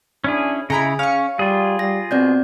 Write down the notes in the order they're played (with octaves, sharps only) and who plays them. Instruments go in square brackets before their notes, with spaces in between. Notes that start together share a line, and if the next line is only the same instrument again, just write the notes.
[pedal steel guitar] C#4 E4 G#4 [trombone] D4
[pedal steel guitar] C#3 E4 [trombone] G#4 [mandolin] D#5 A#5 B5
[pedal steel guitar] C#4 [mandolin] F5 C#6
[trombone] G3 [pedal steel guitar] F4 G#4
[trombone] G3 [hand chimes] A#6
[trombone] B2 [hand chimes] C4 D5 G6